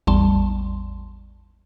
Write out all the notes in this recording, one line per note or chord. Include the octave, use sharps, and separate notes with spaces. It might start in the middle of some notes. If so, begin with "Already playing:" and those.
A1 E2 G3 A5 C6